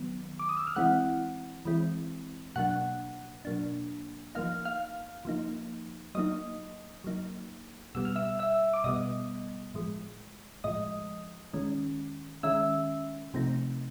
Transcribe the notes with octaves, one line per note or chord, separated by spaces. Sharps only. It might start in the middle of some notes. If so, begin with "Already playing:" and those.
Already playing: D#3 F#3 B3
D6
D#6
E6
F6
E3 G#3 C4 E4 F#5 F#6
E3 G#3 C4 E4
B2 F#3 A#3 D4 F#5 F#6
B2 F#3 A#3 D4
F3 A#3 D#4 F5 F6
F5 F6
F3 A#3 D#4
F#3 A#3 D#4 D#5 D#6
F#3 A#3 D#4
B2 G3 B3 E6
F6
E5 E6
E5 E6
D6
B2 G3 B3 D#5 D#6
A2 F3 G#3
A2 F3 G#3 D#5 D#6
D#3 G#3 C#4
D#3 G#3 C#4 E5 E6
C3 F3 A3 C4 D#4